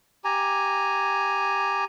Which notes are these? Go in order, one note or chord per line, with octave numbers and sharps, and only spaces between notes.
G4 G#5 A#5